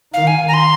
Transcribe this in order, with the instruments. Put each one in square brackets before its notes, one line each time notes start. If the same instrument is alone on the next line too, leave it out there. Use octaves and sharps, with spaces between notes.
[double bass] D#3 [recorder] F5
[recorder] G#5
A#5
C6